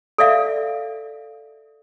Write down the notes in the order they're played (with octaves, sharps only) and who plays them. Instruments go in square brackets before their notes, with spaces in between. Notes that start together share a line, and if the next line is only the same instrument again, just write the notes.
[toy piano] A4 D5 E5 F5